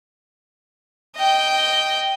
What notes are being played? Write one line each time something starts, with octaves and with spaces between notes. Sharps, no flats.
D#5 G5